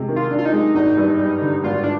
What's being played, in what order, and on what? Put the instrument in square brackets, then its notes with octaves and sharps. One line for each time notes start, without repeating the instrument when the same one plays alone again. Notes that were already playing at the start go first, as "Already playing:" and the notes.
Already playing: [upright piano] C3 G#3
D#3
[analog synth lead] F4
[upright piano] D4
[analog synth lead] F4
D#4
[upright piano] G#3
[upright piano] G#1 [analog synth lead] D#4
[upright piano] G2
G3
D3
[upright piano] G#1 [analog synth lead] F4
[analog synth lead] D4